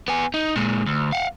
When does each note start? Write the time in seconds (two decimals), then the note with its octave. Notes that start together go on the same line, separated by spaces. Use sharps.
0.08 B3 G#5
0.34 D#4
0.56 A#2 G#3
0.86 D2
1.12 F5 F#5